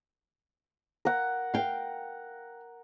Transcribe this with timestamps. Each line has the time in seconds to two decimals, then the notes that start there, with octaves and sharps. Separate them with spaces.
1.05 A#4 F#5
1.54 F5 G5